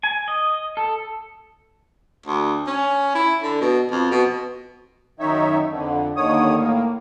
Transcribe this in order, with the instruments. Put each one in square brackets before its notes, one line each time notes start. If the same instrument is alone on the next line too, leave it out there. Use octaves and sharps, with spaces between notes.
[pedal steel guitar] G#5
D#5
A4
[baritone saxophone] D2
C#4
E4
D3
B2
F2
B2
[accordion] F#2 D#3 D#4 C#5 E5
F2 D3
D#2 D3 D#3 C#5 D#6
A2 A#3